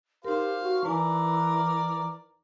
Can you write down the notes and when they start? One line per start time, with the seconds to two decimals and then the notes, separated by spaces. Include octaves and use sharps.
0.25 D#4 G4 A#4 C5 F5
0.62 F#4
0.85 E3 A#4 B4 D5 G#5